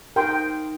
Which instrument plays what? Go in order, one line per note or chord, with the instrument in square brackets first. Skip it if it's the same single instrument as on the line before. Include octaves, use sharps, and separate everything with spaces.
[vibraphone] D#4 [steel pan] A#4 G5 C6